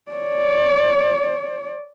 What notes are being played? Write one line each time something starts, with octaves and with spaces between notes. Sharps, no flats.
C#5 D5